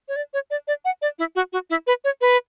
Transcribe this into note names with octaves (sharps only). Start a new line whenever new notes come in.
C#5
D5
C#5
D5
D5
F#5
D5
E4
F#4
F#4
E4
B4
C#5
B4